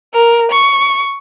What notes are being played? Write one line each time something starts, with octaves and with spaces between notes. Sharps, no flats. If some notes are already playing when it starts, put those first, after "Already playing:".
A#4
C#6